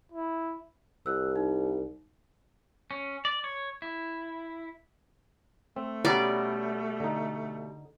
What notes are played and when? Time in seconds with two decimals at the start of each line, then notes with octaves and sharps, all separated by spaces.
0.12 E4
1.06 C2 E6 F#6
1.36 D#4
2.91 C#4
3.25 D5
3.44 C#5
3.82 E4
5.76 A3 C4
6.05 B2 G3 C#4 D5 A#5 D6
7.00 D3 D#4